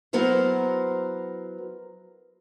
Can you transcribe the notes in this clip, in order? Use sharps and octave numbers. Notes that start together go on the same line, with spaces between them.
F#3 B3 E4 A#4 C5